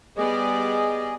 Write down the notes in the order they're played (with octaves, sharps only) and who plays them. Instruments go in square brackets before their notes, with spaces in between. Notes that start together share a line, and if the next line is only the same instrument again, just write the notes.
[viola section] G3 B3 D5 [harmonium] G#4 D#5